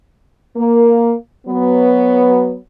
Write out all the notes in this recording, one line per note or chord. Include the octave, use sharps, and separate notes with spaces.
A#3
F#3 B3